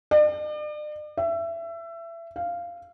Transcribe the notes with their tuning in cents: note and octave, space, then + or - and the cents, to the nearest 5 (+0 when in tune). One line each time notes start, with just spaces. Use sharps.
D5 +40
E5 +25
F5 -10